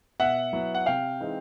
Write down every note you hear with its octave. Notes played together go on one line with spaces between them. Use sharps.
B2 E5 F#5
F#3 B3 E4
F#5
C3 F5 G5
E3 G#3 C4 D#4